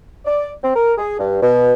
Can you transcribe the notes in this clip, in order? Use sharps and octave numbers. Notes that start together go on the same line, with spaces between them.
D5
C4
A#4
G#4
G2
B2